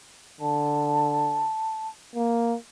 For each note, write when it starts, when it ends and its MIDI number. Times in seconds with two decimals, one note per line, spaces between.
0.41 1.49 50
0.41 1.88 81
2.15 2.55 58